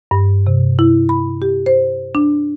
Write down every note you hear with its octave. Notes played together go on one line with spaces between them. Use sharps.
G2
C3
E4
B5
G4
C5
D4